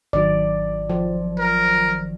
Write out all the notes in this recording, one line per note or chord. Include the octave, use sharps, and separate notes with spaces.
G#1 D#3 F#3 D5
F3
A#4